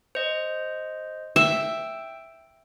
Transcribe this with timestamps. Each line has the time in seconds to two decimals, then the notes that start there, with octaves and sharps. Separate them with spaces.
0.15 C5 D#5
1.36 E5 G5